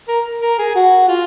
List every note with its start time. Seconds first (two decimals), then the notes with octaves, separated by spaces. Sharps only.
0.08 A#4
0.42 A#4
0.59 G#4
0.75 F#4
1.09 F4